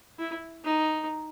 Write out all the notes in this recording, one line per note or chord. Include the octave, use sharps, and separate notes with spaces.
E4
D#4